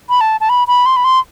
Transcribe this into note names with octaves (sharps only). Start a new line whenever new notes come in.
B5
A5
A5
B5
B5
C6
B5
C6